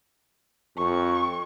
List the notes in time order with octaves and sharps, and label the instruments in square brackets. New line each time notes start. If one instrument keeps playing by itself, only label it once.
[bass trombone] F2 [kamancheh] C#6